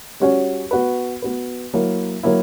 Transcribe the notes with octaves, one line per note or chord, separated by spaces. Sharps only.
G3 C#4 F#4 C#5
B3 F#4 B4
B3 F#4 B4
F#3 A#3 E4
F#3 A#3 E4